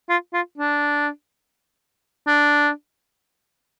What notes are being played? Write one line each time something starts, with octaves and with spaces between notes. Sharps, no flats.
F4
F4
D4
D4